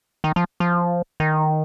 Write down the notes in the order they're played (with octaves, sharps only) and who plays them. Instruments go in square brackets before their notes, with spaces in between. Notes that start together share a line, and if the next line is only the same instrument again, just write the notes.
[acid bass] D#3
F3
F3
D#3